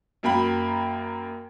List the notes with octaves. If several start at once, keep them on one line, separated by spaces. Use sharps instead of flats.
F#2 A#3 G5 B5